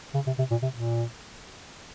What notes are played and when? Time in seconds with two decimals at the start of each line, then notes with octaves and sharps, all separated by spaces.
0.15 C#3
0.27 C3
0.38 C3
0.51 A#2
0.63 C3
0.75 A#2